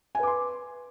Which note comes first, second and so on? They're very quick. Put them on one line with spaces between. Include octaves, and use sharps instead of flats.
G#5 B4 D6 C6